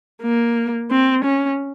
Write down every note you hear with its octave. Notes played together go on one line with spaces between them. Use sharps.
A#3
C4
C#4